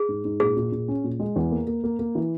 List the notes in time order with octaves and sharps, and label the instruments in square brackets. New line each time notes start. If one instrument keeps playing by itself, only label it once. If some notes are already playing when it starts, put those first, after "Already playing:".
Already playing: [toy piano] G#4
[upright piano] G#2
G#2
[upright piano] A#2 [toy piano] G#4
[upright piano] A#2
A#2
C#4
A#2
G#3
E2
A#3
A#3
A#3
A#3
E3